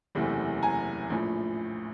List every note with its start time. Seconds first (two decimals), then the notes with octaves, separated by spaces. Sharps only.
0.15 F#1 E2 C3 E3 A3
0.62 G#5 A#5
1.10 A#1 A2 F3